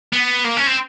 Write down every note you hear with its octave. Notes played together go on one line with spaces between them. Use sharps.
B3
A#3
C#4
C4